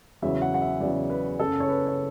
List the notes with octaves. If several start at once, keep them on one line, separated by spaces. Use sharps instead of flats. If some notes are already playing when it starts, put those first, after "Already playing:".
E2 C#3 F#3 E5
F#5
F#5
E5
E2 C#3 F#3 D5
B4
F#1 F#2 C#3 A4
C#5
B4
C#5